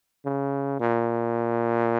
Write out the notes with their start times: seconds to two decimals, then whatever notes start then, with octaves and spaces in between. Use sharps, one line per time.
0.25 C#3
0.80 A#2